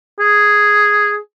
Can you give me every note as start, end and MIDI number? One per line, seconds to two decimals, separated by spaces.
0.20 1.17 68